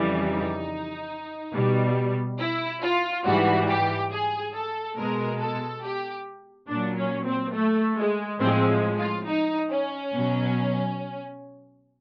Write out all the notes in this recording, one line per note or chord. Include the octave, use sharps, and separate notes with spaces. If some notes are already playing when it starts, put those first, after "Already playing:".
Already playing: F2 C#3 E3 G3
D#4
B2 G3
E4
F4
G#2 E3 G3 F#4
G4
G#4
A4
B2 G#3 A#4
A4
G4
A#2 F#3 D4
C#4
C4
A3
G#3
A2 F3 G#3 C4
F4
D#4
C#4
B2 F#3